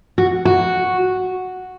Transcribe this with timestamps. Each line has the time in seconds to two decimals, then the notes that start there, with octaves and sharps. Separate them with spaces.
0.18 F#4
0.45 F#4